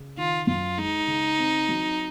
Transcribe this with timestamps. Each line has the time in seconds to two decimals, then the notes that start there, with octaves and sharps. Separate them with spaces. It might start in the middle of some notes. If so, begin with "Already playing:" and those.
Already playing: C#3
0.17 D#3 F4
0.47 F#2 F4
0.78 G#3 D#4
1.07 C#3
1.39 C4
1.69 F#3